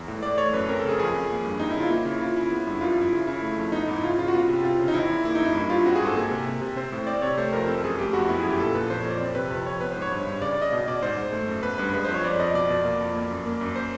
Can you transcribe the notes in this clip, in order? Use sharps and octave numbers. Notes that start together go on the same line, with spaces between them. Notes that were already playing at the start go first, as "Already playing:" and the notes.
Already playing: E2
A2
A2 D5
A3 C#5
F#2 B4
C4 A#4
A4
C#3 G#4
F2 G#4
F2
A#3
G2
C4 D#4
E4
C#3 F4
A#3 E4
C#3 E4
C#3 F4
C#3 E4
B3
G2 E4
F#2 F4
F4
F#2 E4
C#3
C#3 E4
A3
F2
B3 D#4
G#2 E4
C#3 F4
C#3 F4
F#4
B3 F4
C3
C4 F4
C#3
D#4
E2 E4
E2
A#3 E4
D#4
F#2 E4
G2 E4
G2 F4
C4 F#4
G#4
G#2
A4
A#3 G#4
C3
C3
C3
C4 C5
A2
C4 D5
C3 C#5
A3 C5
F2 A#4
C4 A4
F#2 G#4
A3 G4
F2 F#4
B3 E4
G#4
F#2 G4
A#2 A4
A#2 B4
F2 C5
C#5
F2
D5
C4
C3 B4
F2
F2 C#5
B3 B4
C5
G#2
C#5
G2
G2
C#3 D5
D5
C#3 D#5
B2 D#5
B2 D5
G#2 C5
G#2
A3
F#2
B3 B4
G2 B4
G#3 B4
C5
F2
C#5
F2 D5
F2 D#5
B2 D5
B2
A#3
F2
A#3
F#2
A#3
F#2
C5